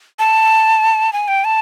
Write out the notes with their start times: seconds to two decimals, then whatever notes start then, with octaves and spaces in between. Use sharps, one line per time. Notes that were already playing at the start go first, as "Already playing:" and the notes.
0.19 A5
1.13 G#5
1.28 G5
1.44 A5